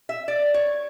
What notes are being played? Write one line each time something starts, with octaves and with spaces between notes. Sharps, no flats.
E5
D5
C#5